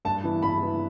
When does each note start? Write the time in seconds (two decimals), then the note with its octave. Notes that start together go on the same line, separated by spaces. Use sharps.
0.05 G2 A5
0.24 E3 B3 E4
0.42 G2 B5
0.61 E3 B3 E4